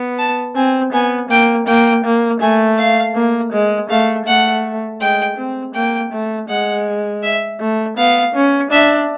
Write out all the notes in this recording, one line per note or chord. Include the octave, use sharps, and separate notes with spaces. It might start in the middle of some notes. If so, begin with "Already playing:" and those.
Already playing: B3
A5
C4 G#5
B3 G#5
A#3 G5
A#3 G5
A#3
A3 G#5
F5
A#3
G#3
A3 F5
A3 F#5
G#3 G5
C4
A#3 G5
A3
G#3 F#5
E5
A3
B3 F5
C#4
D4 E5